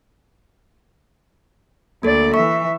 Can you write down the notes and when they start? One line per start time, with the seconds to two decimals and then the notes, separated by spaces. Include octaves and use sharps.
2.03 D2 A#3 A4 D5
2.34 E3 E5 C#6